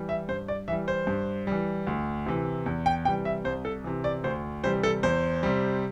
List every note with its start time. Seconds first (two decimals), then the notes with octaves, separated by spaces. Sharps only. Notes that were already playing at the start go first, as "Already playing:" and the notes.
Already playing: E3 G3
0.09 E5
0.29 G2 C5
0.48 D5
0.68 E3 G3 E5
0.88 C5
1.07 G2
1.47 E3 G3
1.87 D2
2.26 C3 E3
2.66 E2
2.86 G5
3.05 C3 E3 G3 G5
3.25 E5
3.45 C2 C5
3.65 A4
3.84 C3 E3
4.04 D5
4.24 D2 C5
4.64 C3 E3 G3 C5
4.83 A4
5.03 E2 C5
5.43 C3 G3